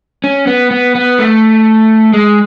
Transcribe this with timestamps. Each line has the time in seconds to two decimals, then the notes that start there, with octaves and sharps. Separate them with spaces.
0.24 C#4
0.47 B3
0.71 B3
0.95 B3
1.19 A3
2.13 G#3